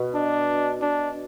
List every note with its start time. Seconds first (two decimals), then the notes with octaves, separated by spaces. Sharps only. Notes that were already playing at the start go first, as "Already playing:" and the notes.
Already playing: B2
0.14 D4
0.82 D4